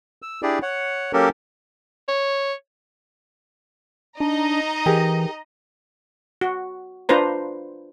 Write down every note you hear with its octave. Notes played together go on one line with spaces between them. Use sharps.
E6
D4 E4 G4 G#4 D5
C#5 F#5
F#3 A#3 C#4 G4 A4 A#4
C#5
D4 D#4 D#5 A#5
E3 G4 G#4 A#4
F#4
D4 F4 B4 C5 A#5